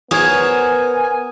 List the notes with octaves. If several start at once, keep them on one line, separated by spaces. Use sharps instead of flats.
B3 A#4 C5 C#5 G#5 D#6 G#6